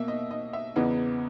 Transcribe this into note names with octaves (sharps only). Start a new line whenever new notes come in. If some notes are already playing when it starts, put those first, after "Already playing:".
Already playing: B2 A#3 E5
D#5
D#5
E5
E2 C#3 E3 B3 D#5